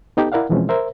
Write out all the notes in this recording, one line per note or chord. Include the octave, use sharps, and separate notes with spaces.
B3 D#4 G4 A4
E4 A#4 D5 F5 F#5
B2 E3 F3 G#3 C4 C#4
A#4 C5 E5